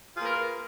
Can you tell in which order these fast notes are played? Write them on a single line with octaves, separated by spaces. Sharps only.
F4 G#4 A#3 B4 A#4